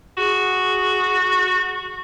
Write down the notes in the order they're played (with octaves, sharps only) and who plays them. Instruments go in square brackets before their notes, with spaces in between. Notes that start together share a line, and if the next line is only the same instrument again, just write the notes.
[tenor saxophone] F#4 [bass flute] G#4